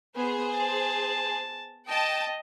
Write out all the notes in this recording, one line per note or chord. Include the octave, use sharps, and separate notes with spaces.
B3 G#4 C5
A5
D#5 G5 A5